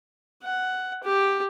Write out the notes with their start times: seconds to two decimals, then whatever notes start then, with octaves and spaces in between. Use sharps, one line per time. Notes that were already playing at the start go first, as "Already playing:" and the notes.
0.43 F#5
1.04 G4